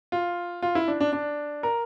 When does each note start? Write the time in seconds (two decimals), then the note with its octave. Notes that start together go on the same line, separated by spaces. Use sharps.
0.12 F4
0.62 F4
0.75 E4
0.88 D4
1.00 D4
1.13 D4
1.63 A#4